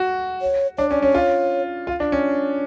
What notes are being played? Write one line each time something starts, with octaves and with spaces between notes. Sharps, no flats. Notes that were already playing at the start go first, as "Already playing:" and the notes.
Already playing: F#4
C#5
D4 C#5
C#4 D5
C#4 C#5
F4
F4
D4
C#4